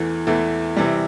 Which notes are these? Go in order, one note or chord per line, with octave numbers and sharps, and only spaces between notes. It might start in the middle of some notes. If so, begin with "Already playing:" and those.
Already playing: E2 E3 A3
E2 E3 A3
C3 E3 G3